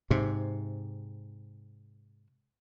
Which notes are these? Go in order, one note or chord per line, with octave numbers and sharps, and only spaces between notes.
G#2 C3